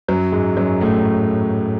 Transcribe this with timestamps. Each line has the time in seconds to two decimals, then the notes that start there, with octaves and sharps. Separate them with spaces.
0.08 F#2 F#3
0.32 G#2 G#3
0.57 F#2 F#3
0.81 A2 A3